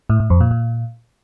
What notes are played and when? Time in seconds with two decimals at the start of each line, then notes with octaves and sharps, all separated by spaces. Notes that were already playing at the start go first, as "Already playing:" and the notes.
0.10 A2
0.20 A2
0.30 F2
0.41 A#2
0.51 A#2